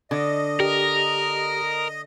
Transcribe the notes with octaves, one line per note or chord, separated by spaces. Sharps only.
D3 D#5
G4 A#4